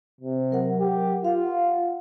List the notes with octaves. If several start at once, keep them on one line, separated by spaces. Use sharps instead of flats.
C3
F#3 A#4 F#5
G4
F4 F5 F#5